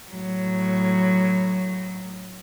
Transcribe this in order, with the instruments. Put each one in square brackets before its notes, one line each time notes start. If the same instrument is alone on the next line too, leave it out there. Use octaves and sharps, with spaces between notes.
[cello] A2 F#3